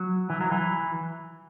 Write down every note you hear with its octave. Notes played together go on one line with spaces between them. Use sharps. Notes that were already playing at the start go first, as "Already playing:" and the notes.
Already playing: F#3
E3
F#3
E3